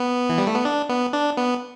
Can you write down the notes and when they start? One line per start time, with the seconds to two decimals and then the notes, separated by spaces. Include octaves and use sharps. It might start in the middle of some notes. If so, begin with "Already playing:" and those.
Already playing: B3
0.29 E3
0.38 G3
0.47 A3
0.56 B3
0.65 D4
0.89 B3
1.13 D4
1.37 B3